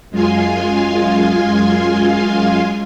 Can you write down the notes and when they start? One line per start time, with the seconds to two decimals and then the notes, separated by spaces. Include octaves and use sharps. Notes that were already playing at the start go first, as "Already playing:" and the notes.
0.11 F#2 G#3 F4 F5 G#5 C6